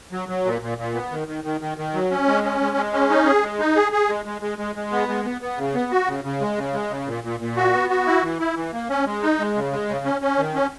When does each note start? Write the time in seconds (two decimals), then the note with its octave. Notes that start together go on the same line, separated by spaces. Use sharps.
0.12 F#3
0.29 F#3
0.45 A#2
0.61 A#2
0.78 A#2
0.94 B3
1.11 D#3
1.28 D#3
1.44 D#3
1.61 D#3
1.78 D#3
1.94 F#3
2.11 C#4
2.27 G#3
2.43 C#4
2.60 G#3
2.77 G#3
2.93 C#4
3.10 D#4
3.26 G#4
3.43 G#3
3.59 D#4
3.76 G#4
3.92 G#4
4.09 G#3
4.25 G#3
4.42 G#3
4.58 G#3
4.76 G#3
4.92 B3
5.08 G#3
5.25 B3
5.42 B3
5.58 C#3
5.74 B3
5.91 F#4
6.08 C#3
6.24 C#3
6.41 G#3
6.58 C#3
6.74 G#3
6.90 C#3
7.07 A#2
7.24 A#2
7.40 A#2
7.57 F#4
7.73 B3
7.90 F#4
8.07 E4
8.22 E3
8.39 E4
8.56 E3
8.73 A#3
8.89 C#4
9.06 G#3
9.22 D#4
9.39 G#3
9.55 C#3
9.72 G#3
9.89 C#3
10.05 C#4
10.21 C#4
10.38 D#3
10.55 C#4